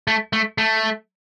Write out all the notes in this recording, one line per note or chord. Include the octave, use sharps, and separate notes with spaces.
A3
A3
A3